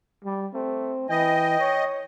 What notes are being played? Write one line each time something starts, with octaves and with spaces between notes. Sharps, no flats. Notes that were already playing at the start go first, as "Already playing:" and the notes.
G3
A3 C4
E3 D#5 G5
C#5